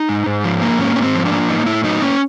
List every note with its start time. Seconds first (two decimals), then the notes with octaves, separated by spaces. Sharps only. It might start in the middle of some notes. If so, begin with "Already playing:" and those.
Already playing: D#4
0.09 G#2
0.26 G#2
0.44 F3
0.62 A#3
0.78 G#2 C#4
0.96 G#2 C#4
1.02 C4
1.15 F3
1.25 D4
1.31 A#3
1.49 A2 D#4
1.66 A2 E4
1.84 F#3 D#4
2.02 A#3 C#4